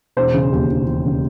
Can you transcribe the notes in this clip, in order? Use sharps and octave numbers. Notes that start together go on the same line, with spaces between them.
E1 C5
C#3
D#2
E1
E1
C#3